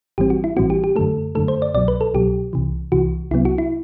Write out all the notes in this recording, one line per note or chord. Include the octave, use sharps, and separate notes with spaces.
A1 A2 E3 G3 C4 G4
F#4
E4
A1 A2 E3 G3 C4 F#4
G4
G4
F#2 D3 A3 A4
F#2 D3 A3 A4
C5
D5
C2 B2 F#3 D5
B4
A4
C2 B2 F#3 G4
C2 C3 E3
C2 C3 E3 F#4
C2 C3 F#3 B3 E4
F#4
E4